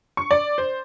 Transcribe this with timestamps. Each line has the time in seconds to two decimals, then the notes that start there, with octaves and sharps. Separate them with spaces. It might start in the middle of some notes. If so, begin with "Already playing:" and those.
0.17 C#6
0.31 D5
0.58 C5